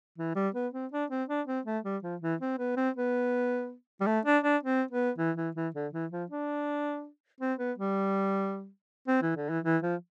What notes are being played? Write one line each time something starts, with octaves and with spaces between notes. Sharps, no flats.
E3
G3
B3
C4
D4
C4
D4
C4
A3
G3
F3
E3
C4
B3
C4
B3
G3
A3
D4
D4
C4
B3
E3
E3
E3
D3
E3
F3
D4
C4
B3
G3
C4
E3
D3
E3
E3
F3